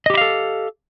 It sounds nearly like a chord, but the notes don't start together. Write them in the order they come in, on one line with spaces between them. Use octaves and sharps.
D#5 G4 E4 F5 A4